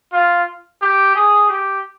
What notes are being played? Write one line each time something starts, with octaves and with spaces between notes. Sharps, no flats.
F4
G4
G#4
G4